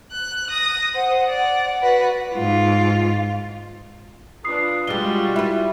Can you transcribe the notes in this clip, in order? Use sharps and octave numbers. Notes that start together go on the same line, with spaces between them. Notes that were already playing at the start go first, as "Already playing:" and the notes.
F#6
D#6 A#6
C5 F#5
D5 F#5
F#4 B4
G#2 F4
D4 F4 B4 D#6 C7
B2 G3 G#3 F4 F#4 G7
E4 B4 E5